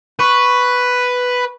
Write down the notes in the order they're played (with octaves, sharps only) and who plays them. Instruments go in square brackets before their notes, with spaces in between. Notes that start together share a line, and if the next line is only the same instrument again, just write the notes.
[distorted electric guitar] B4 [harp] C#6